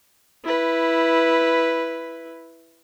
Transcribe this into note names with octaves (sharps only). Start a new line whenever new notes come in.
E4 B4